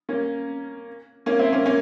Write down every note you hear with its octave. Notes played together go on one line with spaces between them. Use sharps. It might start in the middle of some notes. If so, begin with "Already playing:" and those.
A#3 C#4
A#3 C#4
C4 E4
A#3 C#4
A#3 C#4